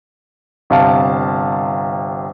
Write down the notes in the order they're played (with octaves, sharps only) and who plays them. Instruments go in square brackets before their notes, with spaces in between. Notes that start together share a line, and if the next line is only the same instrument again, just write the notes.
[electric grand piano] G1 C3 F5 A5